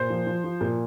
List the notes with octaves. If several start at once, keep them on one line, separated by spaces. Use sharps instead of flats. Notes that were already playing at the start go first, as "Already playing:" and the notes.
Already playing: A#2 C5
F3
F3
F3
A#2